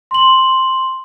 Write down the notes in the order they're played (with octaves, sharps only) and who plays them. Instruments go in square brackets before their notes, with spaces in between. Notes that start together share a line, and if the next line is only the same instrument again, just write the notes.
[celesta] C6 F#7